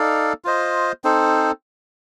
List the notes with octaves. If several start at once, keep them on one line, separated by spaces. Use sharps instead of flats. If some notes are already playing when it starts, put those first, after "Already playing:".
Already playing: D#4 A4 D5 F5
F4 C5 D#5
C4 D#4 A4 C5